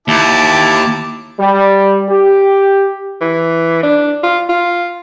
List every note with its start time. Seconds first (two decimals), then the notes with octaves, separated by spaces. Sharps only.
0.08 D#2 E4 A5 D6
1.40 G3
2.10 G4
3.21 E3
3.83 D4
4.23 F4
4.49 F4